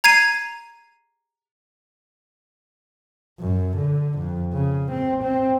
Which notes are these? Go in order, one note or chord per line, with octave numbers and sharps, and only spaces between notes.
A#5 G#6 C7 D#7
F#2
D3
F2
C#3
C4
C4